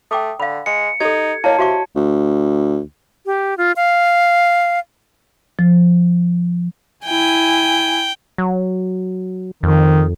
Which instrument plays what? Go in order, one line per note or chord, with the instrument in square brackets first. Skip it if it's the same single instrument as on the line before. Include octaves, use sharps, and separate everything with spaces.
[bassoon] A3 [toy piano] G5 D6 D#6
[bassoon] D3 [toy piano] F5 B5
[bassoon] G#3 [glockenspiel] C#7
[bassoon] D#4 [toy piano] G4 A4 [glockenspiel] G#6
[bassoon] A#3 [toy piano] E4 C#5 D#5 [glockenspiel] A5
[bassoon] C3 [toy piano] F#4 F5 C#6
[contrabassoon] D2
[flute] G4
F4
F5
[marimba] F3
[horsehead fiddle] E4 G#5 [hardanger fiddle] G5
[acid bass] F#3
[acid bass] F2 [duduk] D#3